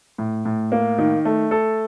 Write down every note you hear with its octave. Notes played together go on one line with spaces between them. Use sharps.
A2
A2
A#3
D#3
A3
A4